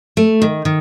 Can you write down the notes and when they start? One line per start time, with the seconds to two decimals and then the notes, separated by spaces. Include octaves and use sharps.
0.17 A3
0.42 D#3
0.65 D#3